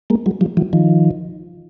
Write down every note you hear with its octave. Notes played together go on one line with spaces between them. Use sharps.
G#3 A#3
F#3 G#3
F3 G3
E3 F#3
D#3 F3